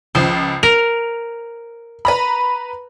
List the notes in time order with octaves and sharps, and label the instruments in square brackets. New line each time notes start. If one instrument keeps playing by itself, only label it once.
[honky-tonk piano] C#2 F3 [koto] C5
[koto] A#4 [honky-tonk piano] F7
[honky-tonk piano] B4 A#5 B5